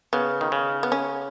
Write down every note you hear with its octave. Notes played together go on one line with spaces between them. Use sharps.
C#3 B3
D#3
C#3
B3
C#4